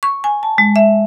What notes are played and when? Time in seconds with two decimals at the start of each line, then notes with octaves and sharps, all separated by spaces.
0.03 C#6
0.24 G#5
0.43 A5
0.58 G#3
0.76 E5